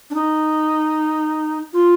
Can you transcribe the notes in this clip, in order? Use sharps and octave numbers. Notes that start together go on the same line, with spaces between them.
D4
D#4
F4